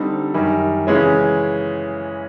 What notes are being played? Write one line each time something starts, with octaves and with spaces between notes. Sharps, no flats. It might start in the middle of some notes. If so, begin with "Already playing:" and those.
Already playing: D3 G3 C4 D#4
F#2 D#3 G3
C#3 E3 G#3 C#4